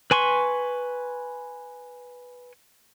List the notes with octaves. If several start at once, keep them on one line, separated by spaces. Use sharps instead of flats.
B4 G#5 C6 C#6